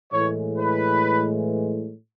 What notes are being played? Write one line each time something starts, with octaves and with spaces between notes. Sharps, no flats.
A2 E3 G#3 C#5
B4